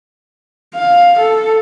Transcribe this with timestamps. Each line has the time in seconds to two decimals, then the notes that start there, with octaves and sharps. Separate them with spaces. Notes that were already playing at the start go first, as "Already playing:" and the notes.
0.75 F5
1.19 A4